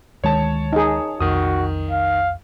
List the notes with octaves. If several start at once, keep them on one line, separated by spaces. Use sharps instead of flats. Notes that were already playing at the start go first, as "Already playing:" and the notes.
D2 D#3 G#3 C#5 A5
D#4 G#4
B1 F2 D#3 F#4 D#6
F5